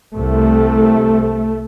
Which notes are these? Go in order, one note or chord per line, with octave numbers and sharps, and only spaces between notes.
C2 C3 A3